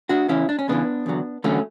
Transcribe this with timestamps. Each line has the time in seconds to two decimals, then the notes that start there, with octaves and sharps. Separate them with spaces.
0.09 D4 F#4
0.28 E2 C#3 E3 C#4 E4
0.49 D4
0.59 C#4
0.68 E2 C#3 E3 B3 D4
1.06 E2 D3 F#3
1.44 E2 D3 F#3 A3 C#4